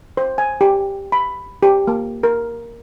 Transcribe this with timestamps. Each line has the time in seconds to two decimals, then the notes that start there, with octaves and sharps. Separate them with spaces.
0.17 C5
0.38 G#5
0.61 G4
1.12 B5
1.63 G4
1.87 A#3
2.23 A#4